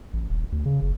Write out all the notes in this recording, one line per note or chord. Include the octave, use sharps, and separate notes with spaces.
A1
D#1
D2
C#3
F#1